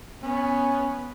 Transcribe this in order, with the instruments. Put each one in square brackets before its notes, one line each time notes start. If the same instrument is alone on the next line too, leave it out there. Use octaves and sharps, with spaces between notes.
[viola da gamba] B3 [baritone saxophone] C#4